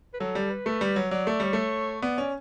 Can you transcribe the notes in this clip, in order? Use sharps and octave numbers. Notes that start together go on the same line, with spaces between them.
B4
F#3 A4
G3
B4
A3
G3
F#3
F#3 D5
A3
G3 C#5
A3
B3 D5
C#4